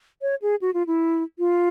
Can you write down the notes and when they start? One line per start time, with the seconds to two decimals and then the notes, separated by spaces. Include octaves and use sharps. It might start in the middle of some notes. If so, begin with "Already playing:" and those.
0.22 C#5
0.42 G#4
0.62 F#4
0.74 F4
0.87 E4
1.39 F4